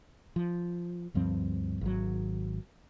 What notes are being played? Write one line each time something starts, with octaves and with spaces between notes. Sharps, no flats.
F3
D2 G2 F3 C4
G#1 F#3